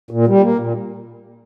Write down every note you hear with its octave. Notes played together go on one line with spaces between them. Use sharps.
A#2
G3
A#3
A#2